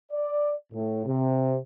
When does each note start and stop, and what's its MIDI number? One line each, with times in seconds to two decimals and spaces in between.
0.12 0.53 74
0.73 1.03 45
1.06 1.57 48